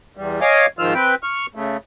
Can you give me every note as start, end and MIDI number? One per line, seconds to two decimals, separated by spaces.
0.17 0.40 40
0.17 0.40 55
0.41 0.66 73
0.41 0.66 75
0.41 0.66 77
0.41 0.66 80
0.41 0.66 86
0.79 0.94 44
0.79 0.94 51
0.79 0.94 53
0.79 0.94 65
0.79 0.94 88
0.79 0.94 89
0.94 1.15 60
0.94 1.15 71
0.94 1.15 79
1.23 1.46 85
1.23 1.46 89
1.55 1.77 49
1.55 1.77 57